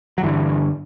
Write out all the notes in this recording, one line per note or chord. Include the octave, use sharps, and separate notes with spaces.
F#3
G2 D3 E3